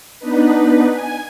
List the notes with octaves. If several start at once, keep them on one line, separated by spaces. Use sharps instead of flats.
B3 D4 D#4 B4
G#5